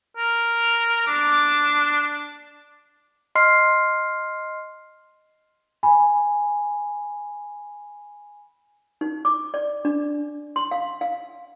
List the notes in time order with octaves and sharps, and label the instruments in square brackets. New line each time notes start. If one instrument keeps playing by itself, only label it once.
[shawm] A#4
[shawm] D4 [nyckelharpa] D6
[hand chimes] D#5 C6 F6 C7
[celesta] G#5 B5
[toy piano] D#4
D6
D5
D4
C6
F5
F5